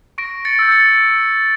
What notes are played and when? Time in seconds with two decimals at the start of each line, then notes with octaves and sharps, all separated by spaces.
0.18 C#6 A#6 D7
0.45 A6 C#7
0.59 E6 G6
0.71 A6 C#7